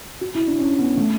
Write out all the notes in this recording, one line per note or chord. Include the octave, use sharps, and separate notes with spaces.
F#4
E4
D4
C#4
B3
A3